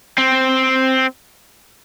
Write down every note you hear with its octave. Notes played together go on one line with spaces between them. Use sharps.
C4